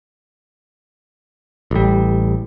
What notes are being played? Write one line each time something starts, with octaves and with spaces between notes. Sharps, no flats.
A1 G3